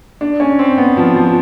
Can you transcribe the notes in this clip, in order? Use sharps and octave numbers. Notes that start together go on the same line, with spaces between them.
D4
C#4
C4
B3
F3
F3